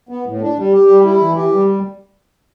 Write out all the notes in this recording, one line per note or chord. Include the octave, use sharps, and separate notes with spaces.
B3
A2
D4
G3
G4
G3
E4
E3
G4
G3